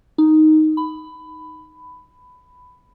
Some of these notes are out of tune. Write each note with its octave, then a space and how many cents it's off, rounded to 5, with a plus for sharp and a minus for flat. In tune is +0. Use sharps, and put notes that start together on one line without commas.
D#4 +0
B5 +15